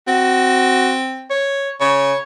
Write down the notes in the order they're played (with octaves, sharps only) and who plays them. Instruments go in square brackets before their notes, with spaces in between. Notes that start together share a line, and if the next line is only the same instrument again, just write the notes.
[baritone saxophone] C4 [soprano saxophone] F#4
[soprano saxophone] C#5
[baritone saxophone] C#3 [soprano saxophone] C#5